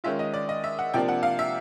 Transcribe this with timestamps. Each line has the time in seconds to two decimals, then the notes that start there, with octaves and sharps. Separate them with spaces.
0.04 D#3 G#3 C#4 F4 E5
0.19 D#5
0.34 D5
0.49 D#5
0.64 E5
0.79 F#5
0.94 C3 F3 A#3 D4 G5
1.09 F#5
1.23 F5
1.39 E5